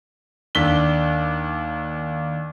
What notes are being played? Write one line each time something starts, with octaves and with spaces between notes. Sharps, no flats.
D#2 D4 B6 G7